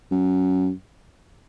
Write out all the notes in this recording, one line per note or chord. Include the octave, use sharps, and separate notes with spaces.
F#2